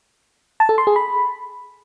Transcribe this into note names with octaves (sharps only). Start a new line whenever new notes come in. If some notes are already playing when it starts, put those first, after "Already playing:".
A5
A4
C6
G#4
B5